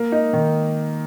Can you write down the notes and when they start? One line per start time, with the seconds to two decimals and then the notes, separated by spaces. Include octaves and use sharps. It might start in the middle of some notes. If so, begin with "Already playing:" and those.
Already playing: A#3
0.12 D#4
0.33 D#3